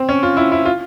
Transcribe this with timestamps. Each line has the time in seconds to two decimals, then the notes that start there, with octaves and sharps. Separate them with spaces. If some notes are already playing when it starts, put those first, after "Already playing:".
Already playing: C4
0.09 C#4
0.23 F4
0.37 E4
0.52 E4
0.66 F4